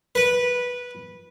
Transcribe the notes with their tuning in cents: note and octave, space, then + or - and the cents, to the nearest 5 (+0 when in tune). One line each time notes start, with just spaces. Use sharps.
B4 -10